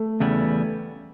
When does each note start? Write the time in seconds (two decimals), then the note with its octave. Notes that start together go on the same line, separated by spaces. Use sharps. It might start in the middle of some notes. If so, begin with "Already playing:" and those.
Already playing: A3
0.20 E2 C#3 G3 B3 E4